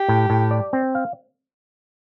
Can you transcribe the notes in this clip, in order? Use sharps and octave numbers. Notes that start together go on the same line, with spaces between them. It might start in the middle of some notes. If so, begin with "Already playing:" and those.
Already playing: G4
A2
A2
D5
C4
F5